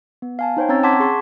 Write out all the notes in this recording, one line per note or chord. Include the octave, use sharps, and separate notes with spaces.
B3
F5 G#5 A5
D#4 C5 C#5 G5
C4 C#4 C#5 A#5 E6 A6
F#5 A5 C6 D6 G#6 B6
G#4 C6 C#6